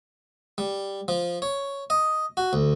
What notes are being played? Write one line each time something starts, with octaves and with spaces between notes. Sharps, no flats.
G3
F3
C#5
D#5
F#4
D2